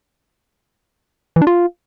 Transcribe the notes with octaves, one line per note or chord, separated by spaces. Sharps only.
E3
D4
F4